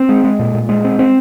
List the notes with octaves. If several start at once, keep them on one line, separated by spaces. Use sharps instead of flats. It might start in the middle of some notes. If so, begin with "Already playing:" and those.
Already playing: C4
G#3
G#3
A#2
A#2
G#3
C4
C4